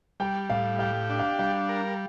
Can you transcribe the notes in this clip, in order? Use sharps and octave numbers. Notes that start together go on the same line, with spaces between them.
G3 G5
A2 F5
G4 F5
D4
F5
G3 F5
A#4